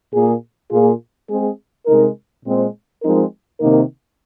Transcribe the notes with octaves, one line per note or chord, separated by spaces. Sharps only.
A#2 A#3 G#4
A#2 A#3 F4 G#4
G#3 C4 G#4
C3 G#3 D#4 A#4
A#2 G#3 C4
F3 G#3 C4 D#4 A#4
C3 D#3 A#3 D#4 A#4